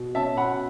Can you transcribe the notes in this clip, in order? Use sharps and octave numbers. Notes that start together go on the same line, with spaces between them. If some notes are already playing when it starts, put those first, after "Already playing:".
Already playing: B2
C#4 E5 A5
B2 F#5 B5